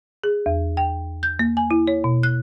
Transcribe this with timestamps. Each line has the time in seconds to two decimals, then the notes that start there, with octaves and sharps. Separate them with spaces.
0.24 G#4
0.46 E2
0.77 G5
1.23 G6
1.39 A#3
1.57 G#5
1.71 E4
1.87 C#5
2.04 B2
2.23 F#6